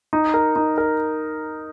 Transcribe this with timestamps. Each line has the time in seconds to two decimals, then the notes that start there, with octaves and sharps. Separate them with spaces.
0.13 D#4
0.34 A#4
0.56 D#4
0.78 A#4